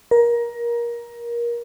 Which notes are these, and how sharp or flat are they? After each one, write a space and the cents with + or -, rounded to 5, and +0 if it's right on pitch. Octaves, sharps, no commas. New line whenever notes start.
A#4 +20